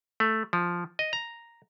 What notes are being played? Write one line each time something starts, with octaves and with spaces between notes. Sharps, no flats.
A3
F3
D#5
A#5